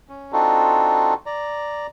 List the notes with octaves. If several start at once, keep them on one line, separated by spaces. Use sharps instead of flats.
C#4
C4 D4 D#4 F4 F#4 A4
D5 A#5